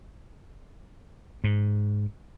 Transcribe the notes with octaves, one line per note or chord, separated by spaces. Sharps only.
G#2